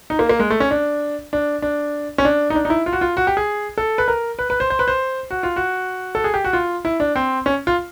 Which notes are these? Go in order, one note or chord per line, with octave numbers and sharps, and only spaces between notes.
D#4
A#3
A#3
G#3
A3
C#4
D4
D4
D4
C#4
D4
D#4
D4
D#4
E4
F4
F#4
F4
F#4
G4
G#4
A4
B4
A#4
B4
B4
C5
C5
B4
C5
F#4
F4
F#4
A4
G#4
G4
F#4
F4
E4
D4
C4
C#4
F4